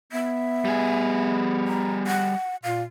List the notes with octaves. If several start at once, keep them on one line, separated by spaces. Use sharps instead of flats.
B3 E5
G3 G#4
A#5
F#5
A#2 F5